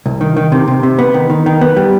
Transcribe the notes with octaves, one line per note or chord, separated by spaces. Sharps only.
C2
D#3
D#3
C3
C3
C3
B3
D#3
D#3
D#3
B3
G3